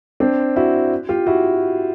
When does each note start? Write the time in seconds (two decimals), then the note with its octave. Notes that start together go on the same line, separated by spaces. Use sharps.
0.20 C4 D4
0.56 E4 F#4
1.09 F4 G4
1.27 E4 F#4